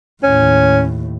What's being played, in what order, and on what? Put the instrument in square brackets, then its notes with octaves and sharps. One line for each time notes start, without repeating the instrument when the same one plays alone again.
[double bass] D#2 A2 [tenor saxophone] C#4